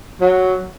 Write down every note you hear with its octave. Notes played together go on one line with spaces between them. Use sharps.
F#3